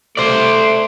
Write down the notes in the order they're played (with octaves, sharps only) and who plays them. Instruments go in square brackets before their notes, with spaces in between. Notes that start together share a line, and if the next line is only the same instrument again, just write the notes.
[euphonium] A3 [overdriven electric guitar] C5 D5